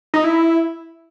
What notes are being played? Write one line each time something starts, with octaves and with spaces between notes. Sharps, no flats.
D#4
E4